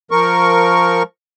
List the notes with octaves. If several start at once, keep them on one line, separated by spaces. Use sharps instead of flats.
F3 A#4 C#6